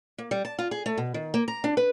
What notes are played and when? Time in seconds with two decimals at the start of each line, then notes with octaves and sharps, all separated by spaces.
0.18 A#3
0.31 G3
0.45 A5
0.59 F4
0.71 G#4
0.86 A3
0.98 B2
1.14 D#3
1.34 A#3
1.48 A#5
1.64 D4
1.77 B4